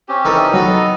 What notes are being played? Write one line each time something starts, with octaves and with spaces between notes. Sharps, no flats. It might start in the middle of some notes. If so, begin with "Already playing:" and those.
C4 C#4 G4
E3 D#4 A4 A#4
F#3 B3 F#4 A4 D#5